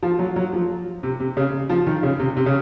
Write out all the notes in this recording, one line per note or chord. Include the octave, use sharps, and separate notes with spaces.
F3
F#3
F#3
F3
C3
C3
C#3
F3
D#3
C#3
C3
C3
C#3